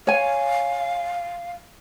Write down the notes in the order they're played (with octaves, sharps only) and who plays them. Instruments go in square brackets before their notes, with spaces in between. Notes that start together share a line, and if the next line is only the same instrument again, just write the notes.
[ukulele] C#5 G#5 [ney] F5